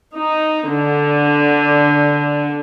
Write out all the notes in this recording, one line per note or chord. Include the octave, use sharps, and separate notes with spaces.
D#4
D3